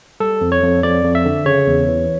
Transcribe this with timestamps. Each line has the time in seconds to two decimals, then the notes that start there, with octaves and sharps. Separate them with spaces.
0.20 G3 A4
0.41 F2
0.52 C#5
0.63 F2
0.83 F2 D5
1.04 F2
1.15 E5
1.25 D3
1.45 C#3 C#5
1.67 E2
1.88 E3